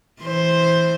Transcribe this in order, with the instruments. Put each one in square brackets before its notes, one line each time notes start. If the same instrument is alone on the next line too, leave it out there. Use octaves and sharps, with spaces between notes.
[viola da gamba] E3 C5